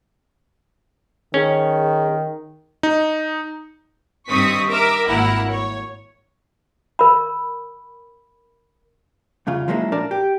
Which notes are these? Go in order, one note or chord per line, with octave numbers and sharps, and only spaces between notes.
D#3 C#4 G#4
D#4
G2 D#3 C4 C#6 D#6 B6
A#4 E5 D6
G#1 A#3 E4 A#4 F#5
C#5
A#4 B5
C2 F2 C#3 F4
F3 F#3 G#3 A#3 C#4 E4
A#2 D4 A#4 D5 A5
G4